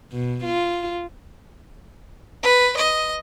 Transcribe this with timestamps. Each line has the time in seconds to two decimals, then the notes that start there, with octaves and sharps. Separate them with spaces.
0.12 B2
0.44 F4
2.43 B4
2.77 D#5